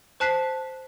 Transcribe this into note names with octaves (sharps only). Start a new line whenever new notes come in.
C5 A5 F#6 B6 C7